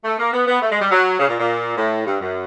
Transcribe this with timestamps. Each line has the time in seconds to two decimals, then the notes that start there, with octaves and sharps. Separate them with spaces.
0.03 A3
0.18 A#3
0.33 B3
0.47 B3
0.61 A3
0.71 G#3
0.81 G3
0.91 F#3
1.19 C#3
1.28 A#2
1.39 A#2
1.76 A2
2.05 G2
2.20 F#2